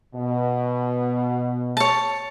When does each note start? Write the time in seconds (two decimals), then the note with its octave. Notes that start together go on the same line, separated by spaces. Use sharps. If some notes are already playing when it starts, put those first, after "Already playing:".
0.15 B2
1.77 C#5 A5